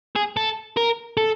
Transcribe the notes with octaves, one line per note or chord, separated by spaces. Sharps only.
G#4
A4
A#4
A4